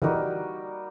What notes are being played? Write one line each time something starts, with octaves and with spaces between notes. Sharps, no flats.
D3 E3 G3 A#3 D#4 F#4